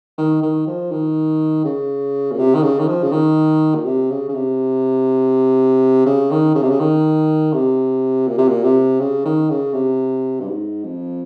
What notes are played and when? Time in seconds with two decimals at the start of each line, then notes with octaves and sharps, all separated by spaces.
0.18 D#3
0.42 D#3
0.67 F3
0.92 D#3
1.65 C#3
2.32 A#2
2.39 C3
2.55 D#3
2.63 C#3
2.79 D#3
2.88 F3
3.03 C#3
3.12 D#3
3.75 A#2
3.86 C3
4.11 C#3
4.29 C#3
4.35 C3
6.06 C#3
6.31 D#3
6.55 C#3
6.62 C3
6.70 C#3
6.80 D#3
7.53 C3
8.27 A#2
8.38 C3
8.48 A#2
8.64 C3
9.00 C#3
9.25 D#3
9.50 C#3
9.74 C3
10.40 G2
10.48 G#2
10.84 F2